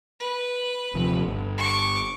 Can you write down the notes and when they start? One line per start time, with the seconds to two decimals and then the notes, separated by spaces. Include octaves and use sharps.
0.20 B4
0.94 D#1 C3 F3
1.26 G1
1.58 C#6 D6